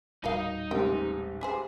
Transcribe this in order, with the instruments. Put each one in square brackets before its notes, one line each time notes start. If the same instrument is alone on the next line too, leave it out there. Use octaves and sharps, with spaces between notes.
[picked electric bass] D#1 A2 G3 [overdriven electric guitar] D#4 D#5 [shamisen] F#4 A#4 F5
[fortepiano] A1 G#2 C3 [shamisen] A#4 G5
[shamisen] G4 G#4 C5